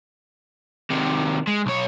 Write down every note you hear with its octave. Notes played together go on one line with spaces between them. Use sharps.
C3 D#3
G#3
B1 C#5